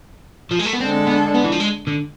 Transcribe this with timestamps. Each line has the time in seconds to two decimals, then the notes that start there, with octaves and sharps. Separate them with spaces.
0.51 F3
0.59 G#3
0.66 A3
0.73 B3
0.80 D3 G#3 C4 D4 A4
1.07 B3
1.34 B3
1.44 E3
1.52 F3
1.60 G#3
1.87 D3